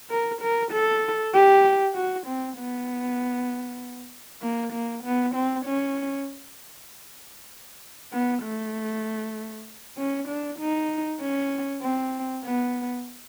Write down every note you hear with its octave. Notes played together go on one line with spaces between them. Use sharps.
A#4
A#4
A4
G4
F#4
C4
B3
A#3
A#3
B3
C4
C#4
B3
A3
C#4
D4
D#4
C#4
C4
B3